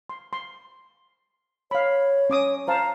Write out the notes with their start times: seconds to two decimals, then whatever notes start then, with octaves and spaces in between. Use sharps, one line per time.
0.09 C6
0.33 C6
1.71 C#5 F5 B5
2.30 C#4 D6 D#6
2.68 C5 F5 A5 A#5